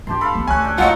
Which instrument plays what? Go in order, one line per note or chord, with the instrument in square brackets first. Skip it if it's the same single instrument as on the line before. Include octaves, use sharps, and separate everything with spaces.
[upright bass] G2 [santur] G4 A5 C6
[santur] A4 F5 [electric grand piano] B5
[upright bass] B3
[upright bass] D2 [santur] C#4 [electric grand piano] G#5 F#6
[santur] D4 G5
[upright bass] D1 D#2 [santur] F#3 D#4 [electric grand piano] F4 D#5 [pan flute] F#5